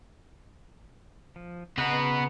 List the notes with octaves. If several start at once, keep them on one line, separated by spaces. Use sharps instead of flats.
F3
C#3 B3 F#4 F#5 A#5